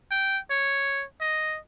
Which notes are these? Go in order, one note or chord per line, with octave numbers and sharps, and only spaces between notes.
G5
C#5
D#5